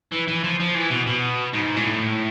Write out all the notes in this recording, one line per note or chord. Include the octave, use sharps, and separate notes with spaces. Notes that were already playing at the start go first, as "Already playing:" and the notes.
E3
E3
F3
F3
E3
B2
B2
G#2
A2